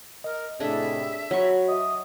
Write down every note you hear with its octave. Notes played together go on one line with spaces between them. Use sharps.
A#4 D#5
A2 C3 D4 G#4 A4 E5
F#3 F#4 C#5 B5 C#6
D#5 E5 D#6